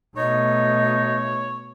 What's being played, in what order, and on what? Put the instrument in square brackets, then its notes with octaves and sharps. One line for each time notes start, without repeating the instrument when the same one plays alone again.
[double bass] B2 A3 [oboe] D#4 [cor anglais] C#5 [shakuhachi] D#5